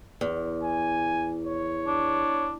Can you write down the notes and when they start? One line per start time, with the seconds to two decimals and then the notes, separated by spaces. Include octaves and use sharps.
0.21 E2
0.63 G#5
1.45 C#5
1.87 D4